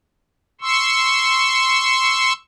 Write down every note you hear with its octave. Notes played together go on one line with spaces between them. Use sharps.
C6 C#6 E6